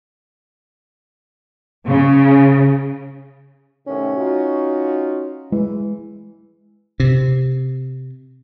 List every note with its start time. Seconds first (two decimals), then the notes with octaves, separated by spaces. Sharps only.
1.88 C#3
3.87 A2 C3 D#3 C#4
4.16 D#4 F4 F#4
5.52 E3 G#3
7.00 C3